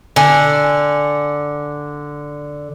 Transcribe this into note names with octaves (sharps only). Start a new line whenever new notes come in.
D3 G#5